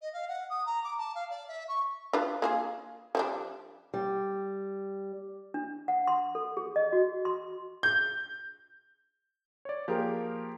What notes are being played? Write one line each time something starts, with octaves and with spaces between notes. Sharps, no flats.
D#5
F5
F#5
D#6
A#5
D6
A5
F5
D5
E5
C#6
D4 F4 B4
A#3 F4 G#4
F3 G3 D4
G3
D4
F#5
C6
A4
G#4
D#5
F#4
C6
G6
C#5 D5
F3 A#3 G4 G#4 A#4